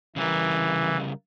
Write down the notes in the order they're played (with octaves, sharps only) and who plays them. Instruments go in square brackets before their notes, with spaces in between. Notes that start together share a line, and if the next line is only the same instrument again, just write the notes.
[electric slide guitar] C#3 G3 A#4 [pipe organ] E3